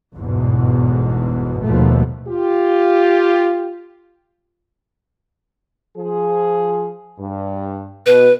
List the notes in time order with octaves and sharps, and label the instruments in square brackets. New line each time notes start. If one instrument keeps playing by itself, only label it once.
[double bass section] G1 E2 G#2 B2
D#2 B2 F3 A3
[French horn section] F4 G4
F3 G#4
G2
[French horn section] B2 [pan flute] B4